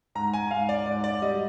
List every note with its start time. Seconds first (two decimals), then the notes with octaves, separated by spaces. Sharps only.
0.15 G#2 A#5
0.33 G#5
0.51 G#2 F5
0.69 D5
0.86 G#2 D5
1.04 D5
1.22 G3 D#5